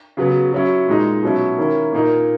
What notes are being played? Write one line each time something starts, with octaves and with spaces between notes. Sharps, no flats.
C#3 F#3 B3
F#3 C#4 E4
A#2 G#3 D#4
B2 F#3 C#4 E4
D#3 A#3 C#4 E4
A#2 A#3 D#4